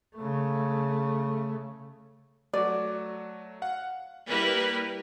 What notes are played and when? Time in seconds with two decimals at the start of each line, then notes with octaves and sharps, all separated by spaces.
0.16 C#3 A3
2.53 F#3 A3 F#4 D5
3.62 F5 F#5
4.28 G3 A#3 E4 A#4 B4